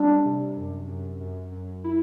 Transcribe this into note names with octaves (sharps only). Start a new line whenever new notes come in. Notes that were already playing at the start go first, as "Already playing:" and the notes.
Already playing: G3 D4
C3
F#2
F#2
F#2
F#2
E4